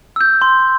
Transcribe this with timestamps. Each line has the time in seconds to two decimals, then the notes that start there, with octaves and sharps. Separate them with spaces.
0.16 E6 G6
0.42 C6